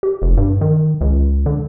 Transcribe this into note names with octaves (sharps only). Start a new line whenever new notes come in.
G4
F1
G2
D#3
C#2
D3